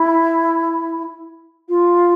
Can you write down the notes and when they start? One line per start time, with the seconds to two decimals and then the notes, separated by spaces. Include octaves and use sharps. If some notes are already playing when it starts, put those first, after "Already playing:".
Already playing: E4
1.69 F4